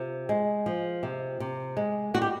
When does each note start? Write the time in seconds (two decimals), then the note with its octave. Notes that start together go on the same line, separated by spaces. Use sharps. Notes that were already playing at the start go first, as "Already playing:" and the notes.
Already playing: C3 F4
0.29 G#3
0.66 F3
1.03 C3
1.40 C3
1.77 G#3
2.14 G3 F#4
2.22 G4